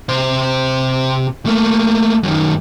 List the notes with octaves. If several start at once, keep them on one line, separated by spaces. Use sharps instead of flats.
C3 C5
A3 A#3
F#2 D#3